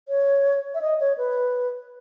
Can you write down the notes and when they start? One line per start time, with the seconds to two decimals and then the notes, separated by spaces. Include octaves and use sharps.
0.08 C#5
0.74 E5
0.81 D#5
1.00 C#5
1.17 B4